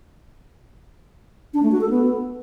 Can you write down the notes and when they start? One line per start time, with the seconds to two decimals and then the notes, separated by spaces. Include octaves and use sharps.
1.54 D4
1.63 A3
1.72 F#4
1.81 A4
1.90 B3